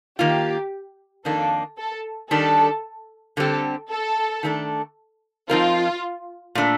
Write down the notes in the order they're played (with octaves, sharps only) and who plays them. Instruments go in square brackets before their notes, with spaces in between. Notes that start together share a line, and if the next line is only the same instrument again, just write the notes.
[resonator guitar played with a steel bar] D#3 A#3 F4 [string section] G4
[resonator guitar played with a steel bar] F2 D#3 A#3 D4 [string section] A4
[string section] A4
[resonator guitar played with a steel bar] D#3 G3 D4 [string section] A4
[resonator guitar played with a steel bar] D3 G3 C4 G4 [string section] A4
[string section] A4
[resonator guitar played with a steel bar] D#3 A3 D4 A4
[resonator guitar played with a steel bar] F3 C4 D#4 A#4 [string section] F4
[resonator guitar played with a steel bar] A#2 A3 D4